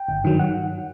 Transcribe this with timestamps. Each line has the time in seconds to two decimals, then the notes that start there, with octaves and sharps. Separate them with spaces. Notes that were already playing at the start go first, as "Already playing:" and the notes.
Already playing: G5
0.08 G1
0.24 G2 D#3 F#3
0.39 F#5